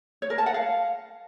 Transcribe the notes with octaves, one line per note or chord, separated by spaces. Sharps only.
C#5
A#4
A5
F#5
F5